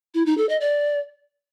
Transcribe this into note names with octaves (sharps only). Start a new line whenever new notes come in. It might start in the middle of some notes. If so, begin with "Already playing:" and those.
E4
D#4
A4
D#5
D5